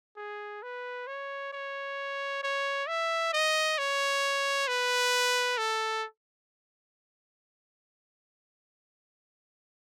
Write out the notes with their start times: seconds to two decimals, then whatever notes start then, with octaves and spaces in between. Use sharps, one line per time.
0.17 G#4
0.63 B4
1.07 C#5
1.53 C#5
2.43 C#5
2.88 E5
3.33 D#5
3.78 C#5
4.68 B4
5.58 A4